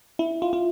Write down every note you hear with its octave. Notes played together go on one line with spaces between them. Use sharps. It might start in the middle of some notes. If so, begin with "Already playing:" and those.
E4
F4
F4